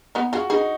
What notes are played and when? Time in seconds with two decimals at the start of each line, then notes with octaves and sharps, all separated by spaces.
0.15 B3 D#4
0.33 F4 F#4 G#4
0.50 D#4 G#4 B4